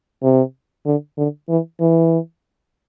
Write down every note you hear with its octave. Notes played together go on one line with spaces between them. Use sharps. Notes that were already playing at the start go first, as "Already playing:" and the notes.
C3
D3
D3
E3
E3